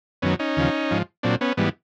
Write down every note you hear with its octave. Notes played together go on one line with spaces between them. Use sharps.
F#2 D#3 F#3 B3 C#4
C#4 D#4
D#2 C#3 F3
G#2 F3
A#2 F#3 C4 D4
B3 C#4
G#2 E3 G3 B3